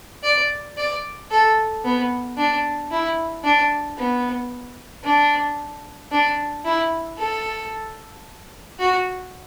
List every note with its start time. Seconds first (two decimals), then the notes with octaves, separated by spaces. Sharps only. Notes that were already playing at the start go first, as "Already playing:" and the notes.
0.23 D5
0.77 D5
1.31 A4
1.84 B3
2.37 D4
2.91 E4
3.44 D4
3.98 B3
5.04 D4
6.11 D4
6.65 E4
7.18 A4
8.79 F#4